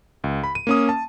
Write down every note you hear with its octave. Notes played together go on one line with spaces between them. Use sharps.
C#2
B5
D#7
A#3 C#4 D#6
A5